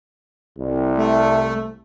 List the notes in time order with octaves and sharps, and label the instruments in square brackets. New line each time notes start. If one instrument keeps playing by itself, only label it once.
[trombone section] C2
[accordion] A3